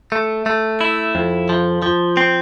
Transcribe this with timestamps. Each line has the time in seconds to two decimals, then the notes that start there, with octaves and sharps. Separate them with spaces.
0.12 A3
0.46 A3
0.81 E4
1.15 F2
1.49 F3
1.82 F3
2.17 C4